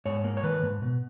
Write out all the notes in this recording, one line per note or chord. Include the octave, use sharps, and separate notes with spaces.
G#2 C#5
A#3
C#5
D#3 B4
G#2
B2